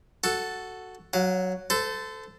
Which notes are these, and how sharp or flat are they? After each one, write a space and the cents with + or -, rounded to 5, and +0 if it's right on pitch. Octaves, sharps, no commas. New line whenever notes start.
F#4 +0 A4 +0
F#3 +0 F5 +40
A4 +0 C5 -35